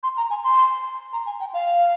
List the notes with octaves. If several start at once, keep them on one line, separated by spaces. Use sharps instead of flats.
C6
A#5
G#5
C6
A#5
G#5
G5
F5